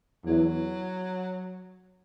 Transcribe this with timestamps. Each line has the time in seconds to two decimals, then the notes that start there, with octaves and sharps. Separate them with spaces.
0.26 E2 F#3